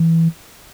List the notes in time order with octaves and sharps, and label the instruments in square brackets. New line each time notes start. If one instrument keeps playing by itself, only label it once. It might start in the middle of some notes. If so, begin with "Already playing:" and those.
Already playing: [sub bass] E3